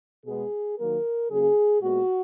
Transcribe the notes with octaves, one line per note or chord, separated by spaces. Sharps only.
B2 G#3 B3 G#4
D#3 F#3 A#3 A#4
C#3 F#3 A#3 G#4
A#2 G#3 B3 F#4